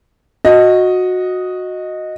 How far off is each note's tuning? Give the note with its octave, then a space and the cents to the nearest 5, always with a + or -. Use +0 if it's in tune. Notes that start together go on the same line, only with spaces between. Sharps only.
F#4 -15 D#5 +0